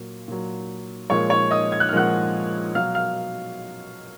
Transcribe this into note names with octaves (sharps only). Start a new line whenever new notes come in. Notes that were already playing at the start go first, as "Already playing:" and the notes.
Already playing: A#2 F#3
A#2 F#3
A#2 F3 G#3 C#5 C#6
C#5 C#6
D#5 D#6
G#6
F#6
F6
A#2 F3 G#3 F#5 F#6
B2 F#3 F5 F6
F5 F6